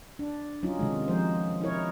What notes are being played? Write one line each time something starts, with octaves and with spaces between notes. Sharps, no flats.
D4
F#3 C#4 D#4 F4
C3 D#3 G#3
F3 G#3 D#4 C5
D#4 E4 A#4 C#5